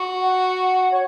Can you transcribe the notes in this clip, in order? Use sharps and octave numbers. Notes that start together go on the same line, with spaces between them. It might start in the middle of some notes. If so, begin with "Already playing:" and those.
Already playing: F#4
F#5
C#5